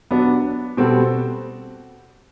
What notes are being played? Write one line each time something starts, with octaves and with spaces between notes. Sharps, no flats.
F#3 B3 D4
B2 G3 C4 F#4 A4